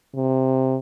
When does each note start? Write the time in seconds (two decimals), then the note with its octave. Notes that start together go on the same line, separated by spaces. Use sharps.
0.15 C3